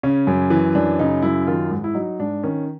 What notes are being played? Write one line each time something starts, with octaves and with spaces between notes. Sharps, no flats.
C#3 C#4
F#2
E3
F#2 D4
C#3 D#4
F#2 E4
D#3 F4
G#2
E4
F#3 D#4
G#2 D4
D#3 C#4